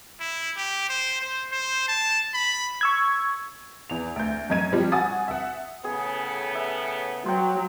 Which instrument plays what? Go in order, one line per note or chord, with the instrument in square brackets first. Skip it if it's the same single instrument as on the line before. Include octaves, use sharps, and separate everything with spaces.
[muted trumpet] E4
G4
C5
C5
C5
A5
B5
[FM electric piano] C#6 E6 G#6
[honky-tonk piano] E2 F7
D2 G6
F#2 D#5 G#6 D#7
F3 G3 C4
F#4 G#5 D#6 A6
E5 F#5
[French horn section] A2 C#3 B3 [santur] G#4
[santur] E5
[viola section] F#3 [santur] C5 G5